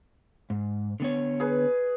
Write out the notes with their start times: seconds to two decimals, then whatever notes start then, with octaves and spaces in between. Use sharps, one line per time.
0.50 G#2
1.00 D3 B3 C#5
1.40 G#4 B4